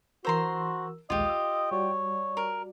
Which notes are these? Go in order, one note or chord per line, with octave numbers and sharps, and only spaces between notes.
E3 F#4 A#4 C5 A#5 C6 E6
A#1 D#2 G#3 F4 G4 D#5
D#6 E6
G3 F#4 C#5 D5
A#4